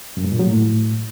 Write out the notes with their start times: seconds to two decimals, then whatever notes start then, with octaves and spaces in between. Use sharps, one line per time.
0.17 F#2
0.24 G2
0.32 A#2
0.39 F#3
0.47 A2